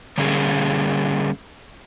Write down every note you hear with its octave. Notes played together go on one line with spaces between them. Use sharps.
D3 G3 A#3 C#4 G#4